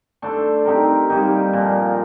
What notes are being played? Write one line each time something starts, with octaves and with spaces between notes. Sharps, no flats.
A3 D4 A4 C5
C4 D#4 G4 A#4
G3 A#3 D#4 G4
A#2 F3 A#3